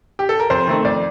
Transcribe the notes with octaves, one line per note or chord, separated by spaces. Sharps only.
G4
A4
A#4
F2 C5
D#3 A3 C4 D#4
F2 D5